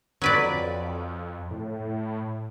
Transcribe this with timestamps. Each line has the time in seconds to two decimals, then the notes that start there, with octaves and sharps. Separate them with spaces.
0.22 F2 F#3 B4 D5
1.51 A2